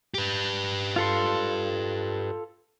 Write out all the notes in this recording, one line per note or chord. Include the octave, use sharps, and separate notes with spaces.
G4 B4
F4 A4 C6